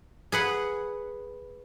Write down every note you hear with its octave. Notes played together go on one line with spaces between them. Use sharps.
G#4 B4 F#5